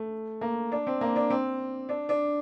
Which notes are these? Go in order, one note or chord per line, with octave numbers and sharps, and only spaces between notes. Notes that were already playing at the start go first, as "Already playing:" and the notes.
Already playing: A3
A#3
D4
C4
A#3
D4
C4
D4
D4